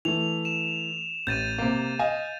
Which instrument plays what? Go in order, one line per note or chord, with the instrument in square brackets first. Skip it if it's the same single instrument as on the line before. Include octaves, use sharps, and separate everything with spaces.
[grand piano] E3 A3 [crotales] F7
[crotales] E7
[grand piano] A1 [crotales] G6 A6 D#7
[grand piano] C3 A#3
D#5 F5 G#5